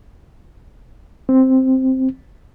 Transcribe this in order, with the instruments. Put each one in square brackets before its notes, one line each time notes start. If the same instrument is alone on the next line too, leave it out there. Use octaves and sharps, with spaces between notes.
[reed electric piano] C4